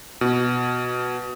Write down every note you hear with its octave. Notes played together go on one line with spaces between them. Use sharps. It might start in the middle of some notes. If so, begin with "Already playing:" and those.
B2